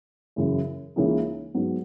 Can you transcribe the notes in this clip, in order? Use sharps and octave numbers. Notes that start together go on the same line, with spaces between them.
F#2 C#3 E3
C#2 C#3 E3 A#3 D#4
G#2 F#3 B3